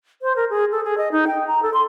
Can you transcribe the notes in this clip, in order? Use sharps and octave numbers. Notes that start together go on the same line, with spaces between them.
C5
A#4
G#4
A4
G#4
D#5
D#4
G5
A#5
A4
C6